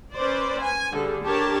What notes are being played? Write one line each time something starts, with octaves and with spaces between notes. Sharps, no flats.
C#4 B4 C5 D5
G#5
D3 G3 G#4 A4
D4 G4 A#4 C#5 A5